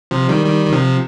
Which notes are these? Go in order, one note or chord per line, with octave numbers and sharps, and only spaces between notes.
C3 F3
D#3 G3
D#3 G3
D#3
C3 F3